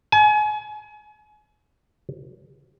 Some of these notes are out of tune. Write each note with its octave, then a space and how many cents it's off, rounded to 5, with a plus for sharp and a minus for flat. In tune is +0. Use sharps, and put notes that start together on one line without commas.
G#5 +35